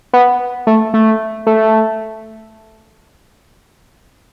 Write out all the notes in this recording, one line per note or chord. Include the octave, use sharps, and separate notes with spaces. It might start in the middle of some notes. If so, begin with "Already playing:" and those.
B3
A3
A3
A3